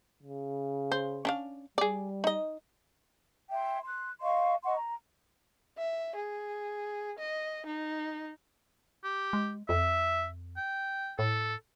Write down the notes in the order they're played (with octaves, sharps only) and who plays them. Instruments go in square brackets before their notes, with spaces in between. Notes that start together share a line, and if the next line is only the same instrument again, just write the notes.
[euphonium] C#3
[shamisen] C5
C#4 D4 F5
[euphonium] G3 [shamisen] G#4 D5
[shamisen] D#4 D#5
[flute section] E5 G5 C6
C6 F#6
D#5 F5 C6 C#6
D#5 F#5 C6 C#6
A#5
[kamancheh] E5
G#4
D#5
D#4
[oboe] G4
[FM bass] G#3
[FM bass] F2 [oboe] E5
[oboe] G5
[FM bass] A2 [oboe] A4